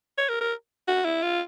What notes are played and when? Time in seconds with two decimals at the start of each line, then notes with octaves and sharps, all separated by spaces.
0.18 C#5
0.29 A#4
0.41 A#4
0.88 F#4
1.05 E4
1.22 F4